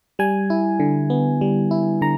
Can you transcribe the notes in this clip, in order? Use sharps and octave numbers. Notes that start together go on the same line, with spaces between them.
G3 G#5
E4
D3
B3
G3
E4
D3 A#5